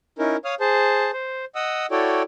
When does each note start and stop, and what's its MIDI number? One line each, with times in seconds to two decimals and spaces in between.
0.19 0.37 61
0.19 0.37 63
0.19 0.37 64
0.19 0.37 70
0.45 0.55 73
0.45 0.55 77
0.45 0.55 87
0.45 0.55 89
0.60 1.11 68
0.60 1.11 72
0.60 1.11 81
1.13 1.45 72
1.55 1.86 75
1.55 1.86 78
1.55 1.86 87
1.55 1.86 88
1.91 2.23 64
1.91 2.23 66
1.91 2.23 69
1.91 2.23 73
1.91 2.23 74
1.91 2.23 79